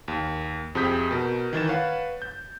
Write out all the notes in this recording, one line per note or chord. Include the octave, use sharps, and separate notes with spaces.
D#2
F2 C3 G#4 D#6 G6 B6
B2 A#4
D#3 E3 A6 E7
B4 C#5 F5 F#5
G6